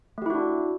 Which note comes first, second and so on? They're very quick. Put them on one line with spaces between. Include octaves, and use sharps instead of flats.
A3 G4 E4 F#4 D4